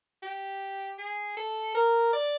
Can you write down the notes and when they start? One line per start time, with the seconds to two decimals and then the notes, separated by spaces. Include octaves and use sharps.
0.23 G4
0.98 G#4
1.37 A4
1.75 A#4
2.13 D5